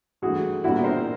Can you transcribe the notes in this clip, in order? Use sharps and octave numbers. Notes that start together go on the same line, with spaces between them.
G2 E3 A3 F#4 G#4
A#2 G3 B3 D4 E4 F#4
A#4 C5